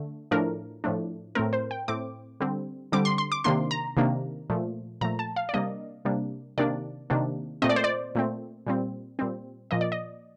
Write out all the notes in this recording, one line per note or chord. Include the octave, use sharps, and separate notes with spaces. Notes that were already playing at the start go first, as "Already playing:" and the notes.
Already playing: D3 A3
A2 F3 A3 D4 A#4
A2 F3 A3 D4
A2 A3 C4 A#4
C5
G5
A2 A3 C4 D6
D3 G3 C4
D3 G3 C4 D6
C6
C6
D6
C3 D#3 A#3 D4 C6
A#5
C3 D#3 A#3 D4
A#2 F3 A3
A#2 F3 A3 A#5
A5
F5
D5
C3 G3 A#3 D4 D#5
C3 G3 A#3 D4
C3 D#3 A#3 D4 D5
C3 D#3 A#3 D4
A#2 A3 C4 D#5
D5
C5
D5
A#2 A3 C4
A#2 G3 C4
A#2 G3 C4
A#2 F3 A#3 D#5
D5
D#5